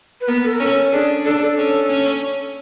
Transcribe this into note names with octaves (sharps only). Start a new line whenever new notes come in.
B4
B3 A#4
A4
A#4
C#4 A4
D4 G#4
D4 A4
A4
C#4 A4
C#4